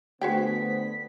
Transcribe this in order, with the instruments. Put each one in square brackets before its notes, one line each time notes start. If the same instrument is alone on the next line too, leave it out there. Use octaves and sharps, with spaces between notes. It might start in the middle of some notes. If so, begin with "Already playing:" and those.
[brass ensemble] D3 B3 [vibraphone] A3 C5 [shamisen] F#4 G#4 G5 [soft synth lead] B6